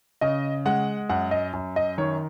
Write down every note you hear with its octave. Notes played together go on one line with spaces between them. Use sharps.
C#3 D#5
G#3 F#5
F#2 F#5
D#5
F#2
D#5
D#3 C#5